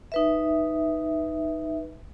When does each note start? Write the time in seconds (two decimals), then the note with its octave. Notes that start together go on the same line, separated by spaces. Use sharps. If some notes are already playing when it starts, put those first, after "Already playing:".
0.12 D#4 B4 E5